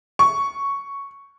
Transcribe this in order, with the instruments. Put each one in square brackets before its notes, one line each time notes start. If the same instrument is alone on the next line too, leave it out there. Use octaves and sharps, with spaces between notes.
[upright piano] C#6